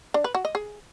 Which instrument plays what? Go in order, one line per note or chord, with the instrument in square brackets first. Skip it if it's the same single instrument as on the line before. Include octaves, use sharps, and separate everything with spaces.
[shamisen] D4
B4
F#4
D#5
G#4